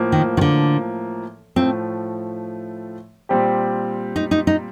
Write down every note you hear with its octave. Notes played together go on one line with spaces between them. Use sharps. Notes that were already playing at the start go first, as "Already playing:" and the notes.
Already playing: A2 F3 A#3
D#3
D#3
D3
A2 F3 A3 C4
A#2 G3 C4 G4
D#4
D#4
D#4